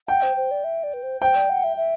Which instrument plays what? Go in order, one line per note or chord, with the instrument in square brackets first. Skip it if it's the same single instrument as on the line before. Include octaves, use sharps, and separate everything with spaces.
[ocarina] F#5 [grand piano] G5
[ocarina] C5
C5
D5
E5
D5
B4
C5
[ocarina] C5 [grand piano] G5
[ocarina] D5
F#5
E5
E5